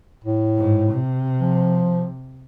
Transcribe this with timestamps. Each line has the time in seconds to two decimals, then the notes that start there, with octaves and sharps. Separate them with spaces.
0.24 A2
0.57 G#2
0.93 C3
1.40 F3